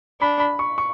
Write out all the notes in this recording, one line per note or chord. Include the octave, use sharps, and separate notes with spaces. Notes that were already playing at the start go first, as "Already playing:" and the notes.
D4 B5
B5
C#6
C#6